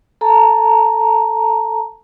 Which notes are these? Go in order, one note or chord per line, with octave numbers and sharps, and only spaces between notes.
A4 A5 A#5